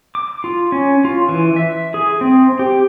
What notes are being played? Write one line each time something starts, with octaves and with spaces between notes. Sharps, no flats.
D6
F4
C#4
F4
E3
E5
G#4
C4
G4